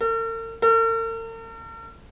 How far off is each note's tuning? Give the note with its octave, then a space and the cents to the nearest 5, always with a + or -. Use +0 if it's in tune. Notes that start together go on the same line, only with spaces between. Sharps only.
A#4 -45
A#4 -45